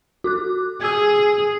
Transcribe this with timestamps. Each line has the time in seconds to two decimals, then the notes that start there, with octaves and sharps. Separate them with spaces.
0.24 F#4 D6 F#6
0.81 G#4 E6 G#6